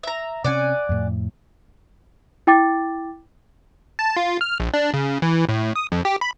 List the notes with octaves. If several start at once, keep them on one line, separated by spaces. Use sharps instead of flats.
E5 A#5
C3 C#4 D5 F#5 G#5
F2 A2
E4 G5 D6 A6
A5
F4
F6
A#1
D4
C#3
E3
A2
D#6
F2
G4
B5